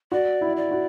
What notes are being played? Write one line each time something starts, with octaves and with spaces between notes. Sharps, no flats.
F#4 D5
E4
D5
F#4